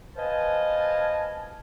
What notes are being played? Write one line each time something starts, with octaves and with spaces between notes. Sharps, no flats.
B4 C5 D#5 F5 G#5 A5